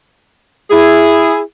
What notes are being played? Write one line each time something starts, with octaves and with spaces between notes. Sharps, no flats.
E4 G#4